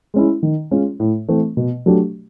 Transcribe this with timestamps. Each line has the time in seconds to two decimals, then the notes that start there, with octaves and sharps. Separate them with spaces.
0.14 G#3 C#4 E4
0.43 D#3
0.71 G#3 C#4 F4
1.00 A2
1.28 E3 A3 C4
1.57 B2
1.86 F#3 A3 D4 G4